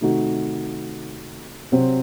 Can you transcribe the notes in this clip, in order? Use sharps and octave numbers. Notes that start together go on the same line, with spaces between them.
C3 D#3 A3 D#4 F#4
C3 F#3 C4 F#4